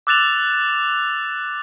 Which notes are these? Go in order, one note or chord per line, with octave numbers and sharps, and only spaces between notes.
D6 E6 F#6 A6 E7 F7